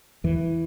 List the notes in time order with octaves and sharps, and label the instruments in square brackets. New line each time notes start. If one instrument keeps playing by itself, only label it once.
[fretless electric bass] E2 E3